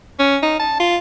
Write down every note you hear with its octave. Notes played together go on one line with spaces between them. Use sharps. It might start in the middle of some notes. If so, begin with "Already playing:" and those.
C#4
D#4
A5
F4